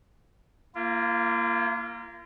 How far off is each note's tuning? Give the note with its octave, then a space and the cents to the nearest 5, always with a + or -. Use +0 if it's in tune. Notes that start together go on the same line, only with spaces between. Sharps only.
A#3 +0 F4 -40